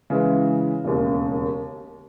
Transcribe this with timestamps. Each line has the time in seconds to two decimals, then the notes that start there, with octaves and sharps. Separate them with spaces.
0.10 C#3 E3 G#3
0.84 E1 D#2 C#3